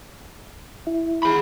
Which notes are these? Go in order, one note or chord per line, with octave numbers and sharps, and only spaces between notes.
E4
G#4 B5